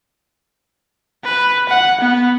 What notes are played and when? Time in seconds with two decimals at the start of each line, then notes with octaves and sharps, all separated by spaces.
1.25 B4
1.69 F#5
2.01 B3